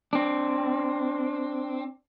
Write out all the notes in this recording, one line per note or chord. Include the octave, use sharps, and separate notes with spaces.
C4 D4